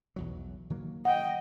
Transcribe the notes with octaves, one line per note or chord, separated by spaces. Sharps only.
B1 E2 F#3
D#3 F#3 A#3
D#5 F#5 G5